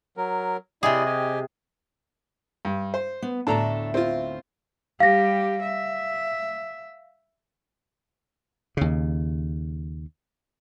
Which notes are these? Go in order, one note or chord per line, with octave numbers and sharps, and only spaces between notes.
F#3 A#4
C3 E4 G#4 D5 D#5
G4 D#5 G#5
G2
C5
B3
D2 A2 D4 A4 E5 A#5
C4 F4
G3 G4 F5 A#6
E5
D#2 C#3